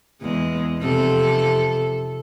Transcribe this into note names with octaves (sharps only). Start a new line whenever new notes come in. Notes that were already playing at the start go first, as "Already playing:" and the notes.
E2 G#3
F2 C3 A4